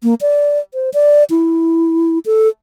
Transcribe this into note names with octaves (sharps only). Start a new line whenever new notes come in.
A#3
D5
C5
D5
E4
A4